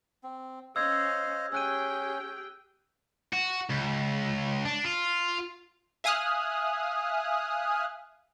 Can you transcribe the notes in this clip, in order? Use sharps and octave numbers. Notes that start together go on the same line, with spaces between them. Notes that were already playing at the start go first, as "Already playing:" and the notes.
C4
C#4 C5 D#5 F5 E6 G#6 C7
C#4 G4 G#4 G5 E6 F#6 D#7
F#4
C#2
D4
F4
E5 F5 G#5 D#6 F6 F#6